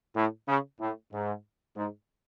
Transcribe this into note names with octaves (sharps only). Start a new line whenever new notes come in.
A2
C#3
A2
G#2
G#2